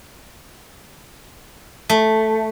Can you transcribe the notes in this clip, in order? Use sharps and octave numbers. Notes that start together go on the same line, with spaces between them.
A3